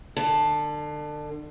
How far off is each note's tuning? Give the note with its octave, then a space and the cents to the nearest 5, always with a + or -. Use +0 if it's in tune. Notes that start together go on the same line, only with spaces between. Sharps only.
D3 +35 A5 +0